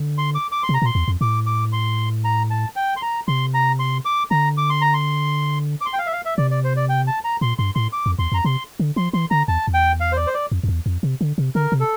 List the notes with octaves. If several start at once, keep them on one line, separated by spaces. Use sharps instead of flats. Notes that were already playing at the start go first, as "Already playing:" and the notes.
Already playing: D3
C6
D6
D6
C6
C3
A#5
A#2 C6
E2
F2
A2 D6
D6
C6
A#5
A5
G5
C6
A#5
C3 C6
A#5
C6
D6
D3 A#5
D6
C6
A#5
C6
D6
C6
G5
F5
E5
F5
E5
C3 D5
D5
C5
D5
G5
A5
A#5
A#2 C6
G2 C6
A2 C6
D6
F2
E2 C6
F2 A#5
C3 C6
D3
F3 C6
E3 C6
D3 A#5
E2 A5
E2
G5
F5
C5
D5
C5
D5
F2
F2
E2
F2
C3
D3
C3
D3 A#4
C3
A4